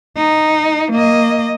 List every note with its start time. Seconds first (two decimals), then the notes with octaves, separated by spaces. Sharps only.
0.17 D#4
0.91 A#3 D#5